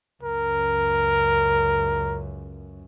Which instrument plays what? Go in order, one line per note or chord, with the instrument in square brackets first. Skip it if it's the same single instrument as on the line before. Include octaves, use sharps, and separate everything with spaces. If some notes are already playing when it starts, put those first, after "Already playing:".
[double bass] C#2 F#2 [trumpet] A#4